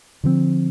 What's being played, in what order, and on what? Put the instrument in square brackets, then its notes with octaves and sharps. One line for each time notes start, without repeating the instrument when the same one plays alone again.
[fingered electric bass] D3 F3 A3 C4